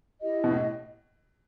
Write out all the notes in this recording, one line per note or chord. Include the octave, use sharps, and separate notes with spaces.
E4 G4 D#5
B2
A2